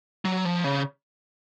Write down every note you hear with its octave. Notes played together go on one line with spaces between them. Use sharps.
F#3
F3
C#3